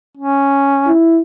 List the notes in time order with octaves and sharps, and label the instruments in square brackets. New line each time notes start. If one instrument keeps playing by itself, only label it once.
[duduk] C#4
[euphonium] E4